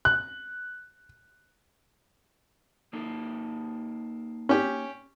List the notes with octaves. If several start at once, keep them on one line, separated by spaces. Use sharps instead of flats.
F#6
A#3 D#4 A4
C#4 G4